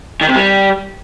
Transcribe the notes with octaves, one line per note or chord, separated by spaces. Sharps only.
D#3
C3
G3